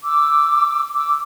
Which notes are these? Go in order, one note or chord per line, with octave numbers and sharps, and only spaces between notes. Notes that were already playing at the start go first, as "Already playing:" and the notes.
D6 E6
D6 E6